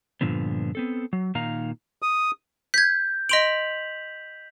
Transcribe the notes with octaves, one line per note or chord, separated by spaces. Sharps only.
G2 A#2 D3 F3 B3
B3 C4 A4
F#3
A#2 D#3 D#4 F5 A#5
D#6
G6 G#6 B6
D#5 C6 B6 D7 F7 F#7